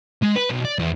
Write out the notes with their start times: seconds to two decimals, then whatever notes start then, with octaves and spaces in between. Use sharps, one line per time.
0.22 G#3
0.36 B4
0.50 B1
0.65 D5
0.79 E2